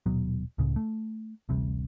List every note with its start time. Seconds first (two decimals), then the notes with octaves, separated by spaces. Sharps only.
0.06 D#1 B2 F#3
0.58 C#2 A2 C#3
0.76 A3
1.49 D1 A1 C3 G3